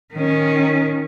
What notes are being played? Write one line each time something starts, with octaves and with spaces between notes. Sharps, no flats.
D#3 C#4